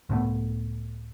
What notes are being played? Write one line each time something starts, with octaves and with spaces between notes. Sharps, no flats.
C#2 A2 A3 B3